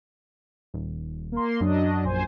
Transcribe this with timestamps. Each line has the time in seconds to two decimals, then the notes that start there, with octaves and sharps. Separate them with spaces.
0.74 D#1
1.32 A#3 C6
1.61 F#2 F#3 D4 D#5
2.04 A#1 C5 G#5